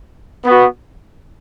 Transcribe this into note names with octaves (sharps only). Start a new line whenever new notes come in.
B3
F#4